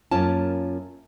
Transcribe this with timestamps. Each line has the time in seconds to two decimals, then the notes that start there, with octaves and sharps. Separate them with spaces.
0.11 F#2 A#3 C#4 F4 A5